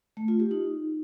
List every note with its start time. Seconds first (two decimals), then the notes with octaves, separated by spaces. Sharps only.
0.17 A3
0.28 F4
0.40 G4
0.51 D#4